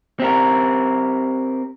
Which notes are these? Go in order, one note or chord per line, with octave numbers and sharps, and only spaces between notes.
C4 G4 A#4